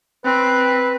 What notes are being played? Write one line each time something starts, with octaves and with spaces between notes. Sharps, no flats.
C4 B4